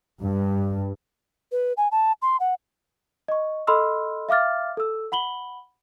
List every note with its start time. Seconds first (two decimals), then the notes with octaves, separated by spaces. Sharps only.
0.20 G2
1.52 B4
1.77 G#5
1.92 A5
2.22 C6
2.40 F#5
3.28 D#5 C#6
3.67 A4 D#5 B5 C6 E6 F6
4.29 E5 F5 D6 F6 A6
4.77 A4 E6
5.12 F#5 B5 F#7 G7